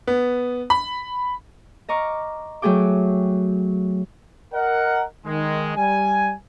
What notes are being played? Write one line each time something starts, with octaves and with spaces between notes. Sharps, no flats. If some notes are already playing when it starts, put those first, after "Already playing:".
B3
B5
D#5 A#5 C#6 D6 F6
F#3 A3 G#4 G5 D6
A#4 D#5 F#5
D#3 G#3
G3 G#5